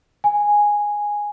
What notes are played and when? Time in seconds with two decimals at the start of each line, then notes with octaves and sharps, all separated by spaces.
0.24 G#5